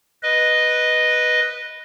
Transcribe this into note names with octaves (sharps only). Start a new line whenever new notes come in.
B4 D#5